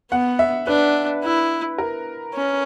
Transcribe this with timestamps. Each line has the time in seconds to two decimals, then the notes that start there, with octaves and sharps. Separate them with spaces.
0.11 B3 F#5
0.39 E5
0.67 D4 B4
1.23 E4
1.78 A#4
2.34 C#4